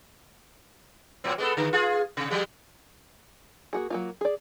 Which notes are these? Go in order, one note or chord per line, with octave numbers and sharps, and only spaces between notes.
A2 F#3 C4
G#3 B3 A4
D3
F4 G#4
C3
F3 G3 G#3
A#3 F#4 G#4
F#3 A#3 F4
G#4 D5